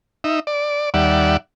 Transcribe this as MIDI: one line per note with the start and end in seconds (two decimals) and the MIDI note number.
0.24 0.40 63
0.24 0.40 76
0.47 0.90 74
0.94 1.37 39
0.94 1.37 55
0.94 1.37 74
0.94 1.37 76
0.94 1.37 78